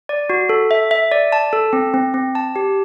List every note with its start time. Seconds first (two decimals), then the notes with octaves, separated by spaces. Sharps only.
0.09 D5
0.30 F#4
0.49 A4
0.71 E5
0.91 E5
1.12 D5
1.32 A5
1.53 A4
1.73 C4
1.94 C4
2.14 C4
2.35 A5
2.56 G4